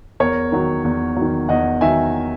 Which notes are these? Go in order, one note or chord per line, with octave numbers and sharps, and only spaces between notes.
E2 A#4 C#5
D#3 F#3
E2
D#3 F#3
E2 D#5 F#5
D#3 F#3 E5 G#5